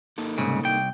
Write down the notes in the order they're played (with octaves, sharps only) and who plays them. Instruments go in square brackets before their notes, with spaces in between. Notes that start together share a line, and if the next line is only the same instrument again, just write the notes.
[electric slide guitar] A#3 D#4 A4
[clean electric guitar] C2 G#2 C#3
C2 G5